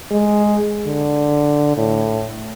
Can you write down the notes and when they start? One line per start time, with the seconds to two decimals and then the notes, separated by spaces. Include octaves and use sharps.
0.11 G#3
0.86 D3
1.77 A2